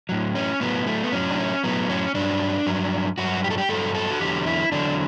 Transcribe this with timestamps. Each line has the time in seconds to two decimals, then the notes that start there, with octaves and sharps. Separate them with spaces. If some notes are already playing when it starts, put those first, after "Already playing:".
0.09 A2 F#3
0.35 C#4
0.60 A2 F#3 B3
0.87 A3
1.04 B3
1.12 A2 F#3 C#4
1.31 D4
1.38 C#4
1.63 A2 F#3 B3
1.89 C#4
2.15 G2 F#3 D4
2.66 G2 F#3
3.18 G2 F#3 F#4
3.44 G4
3.50 A4
3.58 G4
3.69 G2 F#3 A4
3.95 A4
4.11 F#4
4.20 E2 D3 F#3 G4
4.46 E4
4.72 E2 D3 F#3 D4